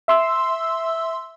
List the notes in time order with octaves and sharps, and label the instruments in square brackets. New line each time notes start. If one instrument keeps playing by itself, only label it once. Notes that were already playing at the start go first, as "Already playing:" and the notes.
[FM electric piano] E5 C6 E6